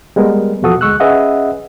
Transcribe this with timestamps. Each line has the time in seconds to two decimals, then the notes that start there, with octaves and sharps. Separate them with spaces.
0.16 G3 G#3 B3 A#4
0.62 E2 B2 F3 F#4 A4 D#6
0.81 D2 G#3 C#6 E6 F#6
1.00 C#4 G#4 B4 D#5 E5 F#5